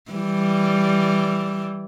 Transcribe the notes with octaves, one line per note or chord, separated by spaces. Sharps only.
E3 G3